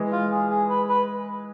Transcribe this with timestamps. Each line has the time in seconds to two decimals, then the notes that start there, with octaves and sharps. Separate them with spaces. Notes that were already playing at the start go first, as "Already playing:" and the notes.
Already playing: E3 G#3
0.12 F4
0.32 G#4
0.50 G#4
0.69 B4
0.89 B4